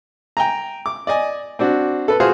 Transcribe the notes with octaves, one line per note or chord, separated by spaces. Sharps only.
G5 G#5 A#5
D6
D5 D#5 G#5
C4 D4 F#4
A4 B4
F4 F#4 G#4 C5 F5